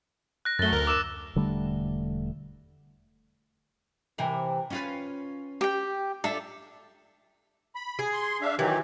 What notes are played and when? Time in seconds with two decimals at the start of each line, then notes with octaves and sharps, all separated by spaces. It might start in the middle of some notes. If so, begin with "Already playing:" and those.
0.45 F#6 A#6
0.59 F#2 A3 A6 G7
0.72 D2 A#4
0.87 D6 E6 E7
1.35 E1 D3 G3 A3
4.18 C3 E3 A#4
4.70 C#4 F4 B4
5.61 G4 G5
6.24 D4 F4 A4 E5
7.75 B5
7.99 G#4
8.14 C6
8.41 D4 E5 F5
8.59 D#3 E3 F#3 G4